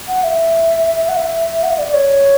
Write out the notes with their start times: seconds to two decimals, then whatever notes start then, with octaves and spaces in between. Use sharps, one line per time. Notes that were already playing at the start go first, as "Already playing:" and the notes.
0.08 F#5
0.24 E5
1.08 F#5
1.16 E5
1.63 F#5
1.70 E5
1.78 D5
1.93 C#5